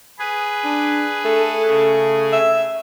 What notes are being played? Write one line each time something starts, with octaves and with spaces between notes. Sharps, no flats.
G#4 B4
D4
A3 A4
C#3 G#4
E5